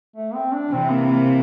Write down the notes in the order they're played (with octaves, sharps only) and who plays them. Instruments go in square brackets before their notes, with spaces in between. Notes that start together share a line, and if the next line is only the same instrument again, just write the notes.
[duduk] A3
C4
D4
[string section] C3 E3 [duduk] C4
[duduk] A#3
A#3